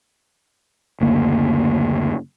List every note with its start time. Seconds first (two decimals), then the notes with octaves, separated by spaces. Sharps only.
1.00 F#1 D2 A#3